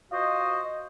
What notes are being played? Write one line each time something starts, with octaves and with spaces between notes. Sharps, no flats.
F4 F#4 C5 D#5